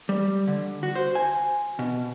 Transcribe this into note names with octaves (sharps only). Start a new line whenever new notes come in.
G3
D3
F#4
C5
G#5
B2